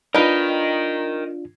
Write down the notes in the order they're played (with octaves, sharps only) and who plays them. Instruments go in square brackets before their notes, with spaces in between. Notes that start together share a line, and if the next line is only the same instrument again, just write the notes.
[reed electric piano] D4 F4 [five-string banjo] D#4 B4 [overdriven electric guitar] A#4 D#5